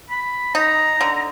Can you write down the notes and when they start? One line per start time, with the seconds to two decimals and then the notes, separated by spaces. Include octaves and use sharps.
0.10 B5
0.55 D#4 A#5
1.01 D3